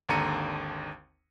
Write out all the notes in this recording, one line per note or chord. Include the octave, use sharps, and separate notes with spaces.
G#1 D#2 D3 A#5 C#7 D#7